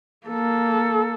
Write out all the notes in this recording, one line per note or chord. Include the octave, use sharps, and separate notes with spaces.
A#3 A4